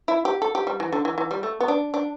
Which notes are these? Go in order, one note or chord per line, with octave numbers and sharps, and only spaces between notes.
E4
G4
A4
G4
G3
E3
D3
E3
E3
G3
A3
B3
D4
D4